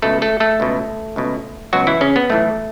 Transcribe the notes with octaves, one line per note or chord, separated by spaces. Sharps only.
C#2 B2 A3 A4
A3 A4
A3 A4
C#2 B2
C#2 B2
C#2 B2 F#3 F#4
E3 E4
C#3 C#4
B3
B1 A2 E3 A3